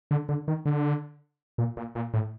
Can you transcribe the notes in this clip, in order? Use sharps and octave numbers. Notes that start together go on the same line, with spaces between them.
D3
D3
D#3
D3
A#2
A#2
A#2
A2